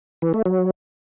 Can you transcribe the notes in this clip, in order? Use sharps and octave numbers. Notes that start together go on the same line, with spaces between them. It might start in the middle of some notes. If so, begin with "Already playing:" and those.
E3
A3
F#3